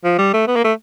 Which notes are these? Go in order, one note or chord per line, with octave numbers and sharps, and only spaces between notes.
F3
G3
A3
B3
A#3
A3